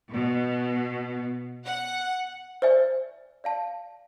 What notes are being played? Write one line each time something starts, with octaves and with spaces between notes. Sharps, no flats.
B2
F#5
C5 D5 E5 G#5
D5 F5 A5